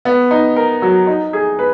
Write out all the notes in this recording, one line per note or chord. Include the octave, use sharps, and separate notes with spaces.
B3
D#4
A#4
F#3
D#4
G#4
B4